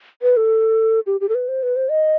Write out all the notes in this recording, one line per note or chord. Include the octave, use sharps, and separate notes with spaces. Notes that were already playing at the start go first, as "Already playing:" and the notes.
B4
A4
G4
G4
A4
B4
C5
B4
C5
D#5